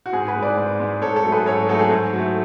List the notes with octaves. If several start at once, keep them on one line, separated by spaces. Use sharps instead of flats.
F#4
G#2 G#4
G#4 B4
G#3
B4 D5
G#2
G#3
G#2 A4 C#5
A4 C#5
F#3 A3
G#4 B4
G#2 A4 C#5
F#3 A3 F#4 A4
G#4
G#2
F#3 A3